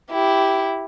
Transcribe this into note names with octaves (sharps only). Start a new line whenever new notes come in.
E4 G4